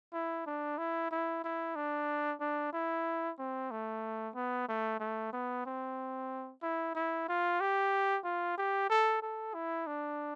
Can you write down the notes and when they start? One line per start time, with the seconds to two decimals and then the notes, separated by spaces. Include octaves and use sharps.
0.13 E4
0.46 D4
0.78 E4
1.11 E4
1.44 E4
1.76 D4
2.41 D4
2.73 E4
3.39 C4
3.71 A3
4.35 B3
4.69 A3
5.00 A3
5.33 B3
5.66 C4
6.63 E4
6.95 E4
7.28 F4
7.61 G4
8.24 F4
8.58 G4
8.89 A4
9.22 A4
9.54 E4
9.87 D4